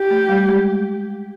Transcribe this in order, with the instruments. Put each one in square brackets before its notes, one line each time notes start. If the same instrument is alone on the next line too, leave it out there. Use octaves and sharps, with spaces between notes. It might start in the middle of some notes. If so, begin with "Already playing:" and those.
Already playing: [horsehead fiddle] G4
[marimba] A3
G3
G#3